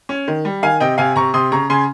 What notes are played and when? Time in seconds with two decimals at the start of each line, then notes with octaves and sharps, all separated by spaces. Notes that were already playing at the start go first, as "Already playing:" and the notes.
0.09 C#4
0.28 D#3
0.45 G3
0.63 D#3 F5 G#5
0.80 C3 D#5 G5
0.98 C3 F5 G#5
1.16 C3 A#5 C#6
1.34 C3 C6 D#6
1.52 C#3 A#5 C#6
1.70 C#3 G#5 C6